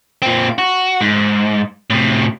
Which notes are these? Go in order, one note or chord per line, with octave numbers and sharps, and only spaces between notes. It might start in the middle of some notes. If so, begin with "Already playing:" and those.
A#2 C4
F#4
G#2
A2 C3